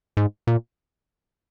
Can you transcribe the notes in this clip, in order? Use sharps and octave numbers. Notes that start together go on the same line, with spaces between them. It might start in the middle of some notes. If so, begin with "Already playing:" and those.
G#2
A#2